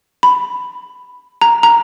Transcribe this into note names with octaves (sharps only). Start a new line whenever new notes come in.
B5
A#5
A#5